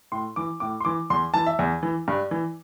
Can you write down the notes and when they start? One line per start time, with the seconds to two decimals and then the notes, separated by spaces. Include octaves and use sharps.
0.12 A2 C6
0.36 E3 D6
0.60 A2 D6
0.80 C6
0.85 E3 D6
1.10 E2 C6
1.34 E3 A5
1.46 E5
1.59 E2
1.83 E3
2.08 G2
2.31 E3